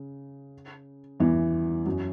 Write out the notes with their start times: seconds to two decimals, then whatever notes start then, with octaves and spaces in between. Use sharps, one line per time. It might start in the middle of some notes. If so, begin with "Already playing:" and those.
Already playing: C#3
1.20 E2 E3
1.85 F#2 F#3